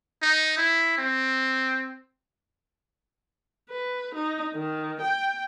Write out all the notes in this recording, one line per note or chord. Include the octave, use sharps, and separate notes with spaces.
D#4
E4
C4
B4
D#4
D#3
G5